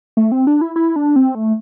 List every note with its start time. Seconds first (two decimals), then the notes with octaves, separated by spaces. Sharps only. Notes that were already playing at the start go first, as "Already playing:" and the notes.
0.17 A3
0.32 C4
0.47 D4
0.61 E4
0.76 E4
0.96 D4
1.16 C4
1.35 A3